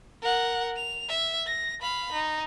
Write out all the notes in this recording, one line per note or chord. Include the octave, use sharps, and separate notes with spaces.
A#4 F#5
F7
E5
A#6
F5 B5
D#4